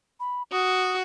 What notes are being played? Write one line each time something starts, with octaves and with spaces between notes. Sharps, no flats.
B5
F#4 D#6